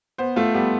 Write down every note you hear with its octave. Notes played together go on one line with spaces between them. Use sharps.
B3 C5
A3 F4
G3 B3